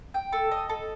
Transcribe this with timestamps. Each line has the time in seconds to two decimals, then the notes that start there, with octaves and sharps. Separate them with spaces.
0.14 G5
0.33 A4
0.51 D#5
0.69 A4